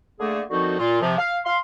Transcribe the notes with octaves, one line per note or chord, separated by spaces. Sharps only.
D3 A3 A#3 G#4
D3 D#3 F3 C4 D#4 F#4
A#2 F4
C3 F3
F5
F5 C6